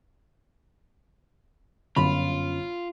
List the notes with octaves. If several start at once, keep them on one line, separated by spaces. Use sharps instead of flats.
G1 F#2 C#4 F4 B5